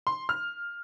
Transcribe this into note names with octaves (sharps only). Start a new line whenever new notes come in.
C6
F6